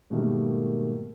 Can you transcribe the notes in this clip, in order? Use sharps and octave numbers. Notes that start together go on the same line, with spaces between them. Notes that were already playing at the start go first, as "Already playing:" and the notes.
G#2 B2 D#3 G3 A3 A#3